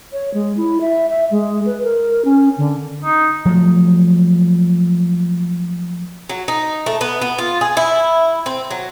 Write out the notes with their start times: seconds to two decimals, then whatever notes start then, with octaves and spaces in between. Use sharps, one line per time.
0.12 C#5
0.34 G#3
0.57 E4
0.81 E5
1.10 E5
1.31 G#3
1.65 B4
1.83 A#4
2.25 C#4
2.58 D3
3.04 D#4
3.45 F3 F#3 A3
6.29 F#3
6.48 D#4
6.86 A3
7.01 B3
7.22 B3
7.38 F4
7.61 G#4
7.77 E4
8.46 C4
8.71 F#3